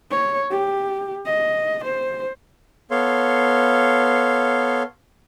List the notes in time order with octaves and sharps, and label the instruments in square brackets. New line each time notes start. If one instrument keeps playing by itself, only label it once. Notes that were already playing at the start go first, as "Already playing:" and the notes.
[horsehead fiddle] C#5
G4
D#5
C5
[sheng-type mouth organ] B3 A4 C#5 F5 C6